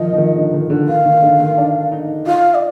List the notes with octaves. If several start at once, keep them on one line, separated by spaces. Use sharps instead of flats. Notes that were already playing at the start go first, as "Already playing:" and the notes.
Already playing: D#3 F3 D#5
F3
D#3
D3
D#3
D3
D#3 F5
D#3
D3
D#3
D4
D#4
F4 F5
D5